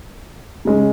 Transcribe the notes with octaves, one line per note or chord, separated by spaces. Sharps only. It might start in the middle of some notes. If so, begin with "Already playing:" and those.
C#3 G#3 C#4